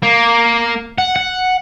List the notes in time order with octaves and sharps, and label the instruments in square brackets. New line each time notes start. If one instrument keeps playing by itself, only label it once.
[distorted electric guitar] A#3
F#5
F#5